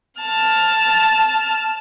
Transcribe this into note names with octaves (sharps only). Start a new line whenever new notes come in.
A5 F6